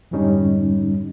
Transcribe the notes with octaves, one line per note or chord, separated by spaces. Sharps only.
F2 G#2 D3 G3 C#4 D#4